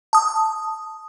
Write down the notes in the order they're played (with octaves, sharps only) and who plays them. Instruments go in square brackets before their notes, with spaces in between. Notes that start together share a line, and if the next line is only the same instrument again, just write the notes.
[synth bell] A5 D#6